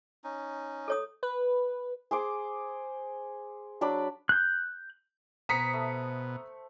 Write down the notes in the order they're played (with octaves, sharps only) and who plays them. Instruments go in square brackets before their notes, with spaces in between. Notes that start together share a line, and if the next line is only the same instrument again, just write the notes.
[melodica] C#4 D#4
[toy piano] A4 C#5 D#6
[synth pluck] B4
[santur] G#4 C5 D6
F#3 D4 D5 B5
[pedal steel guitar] F#6 G6
[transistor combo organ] B2 [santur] C5 [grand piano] A#5 [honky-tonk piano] D#6 B6 C#7
[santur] A3